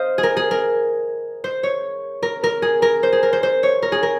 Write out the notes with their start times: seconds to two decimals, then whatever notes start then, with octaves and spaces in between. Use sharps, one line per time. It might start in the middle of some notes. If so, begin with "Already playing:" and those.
Already playing: C5 D#5 F5
0.18 G#4
0.23 A#4
0.37 G#4
0.51 A#4
1.44 C5
1.63 C#5
2.23 A#4
2.44 A#4
2.62 G#4
2.82 A#4
3.03 C5
3.12 G#4
3.23 A#4
3.33 C5
3.43 C5
3.63 C#5
3.82 A#4
3.92 G#4
4.03 A#4